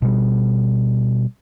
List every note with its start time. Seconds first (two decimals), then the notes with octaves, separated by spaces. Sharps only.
0.02 B2 G3